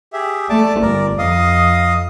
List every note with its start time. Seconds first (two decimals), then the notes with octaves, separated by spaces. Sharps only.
0.13 G4 G#4 E5
0.50 A3 D5 A5 D6
0.82 G1 A#4 D5
1.18 F2 D#5 F5 D#6